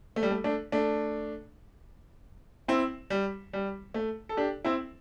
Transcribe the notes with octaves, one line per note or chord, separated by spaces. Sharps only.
A3
G3
A3
A3 D4
A3 D4
C4 E4
G3
G3
A3
A4
D4 G4
C4 E4